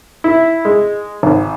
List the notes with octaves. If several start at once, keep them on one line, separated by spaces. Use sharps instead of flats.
E4
G#3
G#1